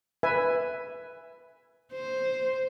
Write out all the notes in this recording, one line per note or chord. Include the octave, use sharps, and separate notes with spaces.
B4 E5 G#5
C5